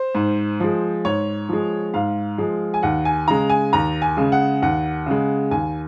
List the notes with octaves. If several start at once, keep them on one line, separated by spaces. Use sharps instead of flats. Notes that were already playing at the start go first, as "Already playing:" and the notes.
Already playing: C5
G#2
F3 G#3
G#2 C#5
F3 G#3
G#2 F5
F3 G#3
G#5
D#2 F#5
G#5
C#3 G#3 A#5
G#5
D#2 A#5
G#5
C#3 G#3
F#5
D#2 F#5
C#3 G#3
D#2 G#5